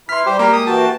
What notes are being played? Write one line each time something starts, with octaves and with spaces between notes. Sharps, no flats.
E4 B4 C6 F6 B6
G3 G4 C5
A#3 G4 A#4
G#3 D#6
E3 F#4 G5 A5